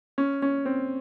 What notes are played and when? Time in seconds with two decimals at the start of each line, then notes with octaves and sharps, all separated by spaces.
0.18 C#4
0.42 C#4
0.65 C4